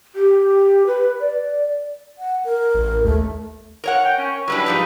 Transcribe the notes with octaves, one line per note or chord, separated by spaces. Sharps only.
G4
B4
D5
F#5
A#4
A1
D#2 A3
A#4 C#5 F#5
G5
C#4
C#5
F#3 G3 D4 E4 B4
G#2 F3 G3 D#4